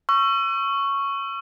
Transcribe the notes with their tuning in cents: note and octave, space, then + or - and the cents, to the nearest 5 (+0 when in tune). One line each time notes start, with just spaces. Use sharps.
C#6 +0 E6 +40